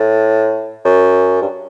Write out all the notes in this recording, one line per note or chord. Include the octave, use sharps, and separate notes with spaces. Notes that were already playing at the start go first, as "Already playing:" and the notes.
Already playing: A2
F#2
G2